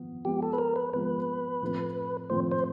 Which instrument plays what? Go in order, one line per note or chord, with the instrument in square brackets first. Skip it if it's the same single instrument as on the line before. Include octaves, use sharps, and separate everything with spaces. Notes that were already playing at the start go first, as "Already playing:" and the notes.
Already playing: [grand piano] F3 B3
[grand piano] F3 G#3 B3 [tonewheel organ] G4
[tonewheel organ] A4
B4
A#4
B4
[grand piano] F3 G#3 B3 [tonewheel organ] B4
[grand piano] A2 F3 A3 C4
[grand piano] A2 F3 A3 C4 [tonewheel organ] C5
[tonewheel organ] C5